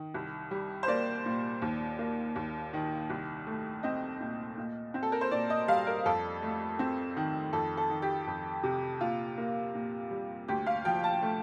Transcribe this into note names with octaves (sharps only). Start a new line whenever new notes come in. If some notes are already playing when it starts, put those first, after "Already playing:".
Already playing: D#3
C2
G3
C5
A#3 D5
A#2
D#2
A#3
D#2
D#3
C2
A3
C4 D#5
A#2
A#2
C4
A4
A#4
C5
A#2 D5
D#5
G3 F5
A#4
F2 A4
A3
C4
D#3
F2 A4
A4
D#3
G4
F2
C3
A#2 F4
A#3
A#2
G3
D2 G4
F5
F3 G5
A5
A3